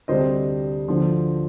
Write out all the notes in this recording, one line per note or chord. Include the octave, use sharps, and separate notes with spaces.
D2 C3 G3 D4 C5 D#5
D2 D3 F3